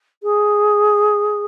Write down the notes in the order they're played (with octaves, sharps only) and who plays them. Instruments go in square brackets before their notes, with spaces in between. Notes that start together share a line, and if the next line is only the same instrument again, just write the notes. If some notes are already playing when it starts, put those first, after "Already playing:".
[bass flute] G#4